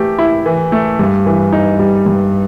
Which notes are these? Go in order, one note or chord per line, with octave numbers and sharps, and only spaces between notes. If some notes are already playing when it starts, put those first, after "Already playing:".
Already playing: E3 A3 G4
E4
E3
A3
G2
E3
D#4
G3
G2